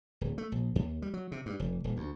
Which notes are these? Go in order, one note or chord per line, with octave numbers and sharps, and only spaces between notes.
D1
A3
A#1
D#2
G3
F#3
C3
G2
F1
D#1
D2